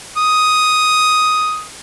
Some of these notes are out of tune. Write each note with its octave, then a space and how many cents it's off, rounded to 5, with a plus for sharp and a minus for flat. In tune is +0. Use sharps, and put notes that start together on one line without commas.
D#6 +5